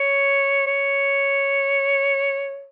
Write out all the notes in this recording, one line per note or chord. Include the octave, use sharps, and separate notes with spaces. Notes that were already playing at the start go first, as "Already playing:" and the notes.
Already playing: C#5
C#5